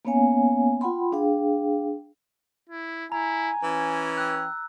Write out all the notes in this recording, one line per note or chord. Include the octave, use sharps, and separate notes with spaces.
A#3 B3 C#4 C#5 F5 G#5
F4 F#5 G5 B5 C6
D4 G#4 F5 G5
E4
E4 G#5 A#5
E3 C#4
G5 E6 F#6